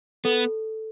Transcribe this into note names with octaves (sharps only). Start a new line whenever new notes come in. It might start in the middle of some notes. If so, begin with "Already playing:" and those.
B3 A4